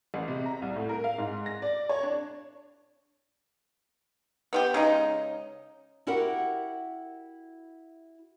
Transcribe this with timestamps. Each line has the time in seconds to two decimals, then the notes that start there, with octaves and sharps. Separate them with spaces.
0.14 A1
0.28 C3
0.46 A#5
0.62 C2
0.76 A2
0.89 A#4
1.04 F5
1.18 G#2
1.46 A#6
1.62 D5
1.89 C#5
2.03 D4
4.53 B3 F4 G4
4.74 C#3 G#3 D#4
6.07 E4 F#4 G4 A#4 F#5